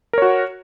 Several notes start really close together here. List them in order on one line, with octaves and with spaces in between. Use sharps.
A#4 C#5 F#4